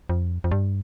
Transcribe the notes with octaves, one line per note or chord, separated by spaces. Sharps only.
F2
F2
G2